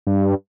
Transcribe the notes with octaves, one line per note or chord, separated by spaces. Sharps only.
G2